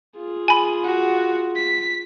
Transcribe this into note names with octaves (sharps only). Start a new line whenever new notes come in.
F4 G#4
G#5 B5
F#4
B6